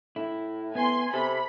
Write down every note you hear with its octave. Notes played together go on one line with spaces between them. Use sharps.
A2 E4
B3 G#5 C6
C3 A4 B5